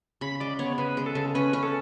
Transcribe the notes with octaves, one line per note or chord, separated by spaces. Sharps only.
C#3 B5
G#3 D5
B3 C#5
C#3 B4
G#3
A4
C#3
C#4 B4
C#4
A4